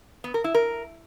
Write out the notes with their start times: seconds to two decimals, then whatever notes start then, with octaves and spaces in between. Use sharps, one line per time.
0.24 B3
0.34 A#4
0.44 E4
0.54 A#4